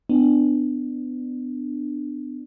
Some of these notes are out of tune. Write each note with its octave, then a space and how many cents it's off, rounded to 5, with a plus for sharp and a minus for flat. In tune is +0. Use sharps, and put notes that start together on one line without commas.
B3 +30 D4 +20